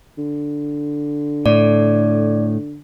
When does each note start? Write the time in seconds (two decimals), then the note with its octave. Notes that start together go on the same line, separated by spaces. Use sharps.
0.18 D3
1.46 A2 D5